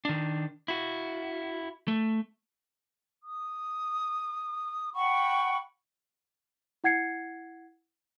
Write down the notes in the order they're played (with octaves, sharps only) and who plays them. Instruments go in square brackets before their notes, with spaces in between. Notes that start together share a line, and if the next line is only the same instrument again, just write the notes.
[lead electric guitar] D#3 D4
E4 F#4
A3
[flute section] D#6
F#5 G5 B5 C#6
[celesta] E4 F#5 G#6 C7 C#7